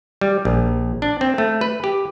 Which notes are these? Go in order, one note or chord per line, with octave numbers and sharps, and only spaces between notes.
G3
A#1
D4
C4
A3
B4
G4